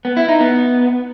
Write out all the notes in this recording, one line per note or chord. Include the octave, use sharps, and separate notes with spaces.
B3
E4
D#4
B3